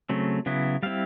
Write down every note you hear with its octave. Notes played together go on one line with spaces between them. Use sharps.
C#3 F#3 A3 C4
C#3 F#3 B3 E4
G3 C4 E4 F5